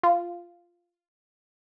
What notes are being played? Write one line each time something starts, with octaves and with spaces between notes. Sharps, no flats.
F4